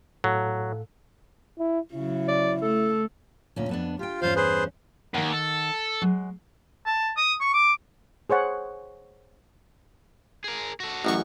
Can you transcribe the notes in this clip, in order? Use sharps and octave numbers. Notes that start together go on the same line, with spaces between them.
A2 F#3 A4 F5
E4
C#3 F#3 E4
D5
A3 A4
D2 A#2 C#4
F2 B3 D4
F4 G4 G5
E2 G2 C#4 F4 C5 F5
G#4 B4 C5
D#2 D#3 F#5
A4
F#3 G#3
A5
D#6
C#6
D6
G#4 C5 C#5 F#5
G#4 A#4
F#4 A4
A1 F#2 C#6